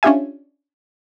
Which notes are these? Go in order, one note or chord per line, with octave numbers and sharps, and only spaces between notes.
C#4 D4 F4 G4 E5 G#5